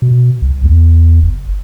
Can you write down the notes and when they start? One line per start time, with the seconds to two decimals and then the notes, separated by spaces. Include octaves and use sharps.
0.02 B2
0.42 C2
0.63 E2
1.23 F#1